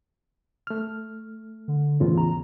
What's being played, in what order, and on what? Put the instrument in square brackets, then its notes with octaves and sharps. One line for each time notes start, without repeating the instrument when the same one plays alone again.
[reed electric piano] A3 F6
[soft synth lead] D3
[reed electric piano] E2 A2 C#3 [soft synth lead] F4
[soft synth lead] A#5